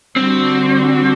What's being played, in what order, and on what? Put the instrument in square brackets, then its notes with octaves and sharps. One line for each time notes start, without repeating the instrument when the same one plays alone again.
[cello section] D3 G3 D4 F#4 [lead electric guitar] C4